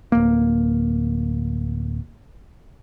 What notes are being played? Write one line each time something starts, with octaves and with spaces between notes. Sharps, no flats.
D1 A#3